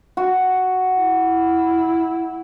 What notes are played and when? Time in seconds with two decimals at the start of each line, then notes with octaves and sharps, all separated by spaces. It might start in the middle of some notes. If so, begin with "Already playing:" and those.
0.17 F#4
1.00 E4